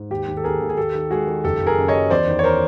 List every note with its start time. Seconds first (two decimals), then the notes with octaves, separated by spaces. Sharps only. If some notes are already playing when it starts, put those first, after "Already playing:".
Already playing: G#2
0.10 D#2 G4
0.28 D#2
0.37 A4
0.44 D#2 G#4 A#4
0.61 D#2
0.69 G#4
0.77 D#2 G4 A4
0.95 D#3
1.10 G#3 F#4 G#4
1.27 D#3
1.44 F#1 G4 A4
1.61 F#1
1.67 G#4 A#4
1.78 F#2
1.88 C#5 D#5
1.94 F#2
2.10 E2 C5 D5
2.27 D#3
2.39 C#5
2.44 A#4 C5